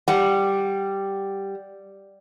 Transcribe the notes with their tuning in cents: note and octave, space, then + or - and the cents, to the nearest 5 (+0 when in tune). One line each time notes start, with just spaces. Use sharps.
G3 +0 F#5 +0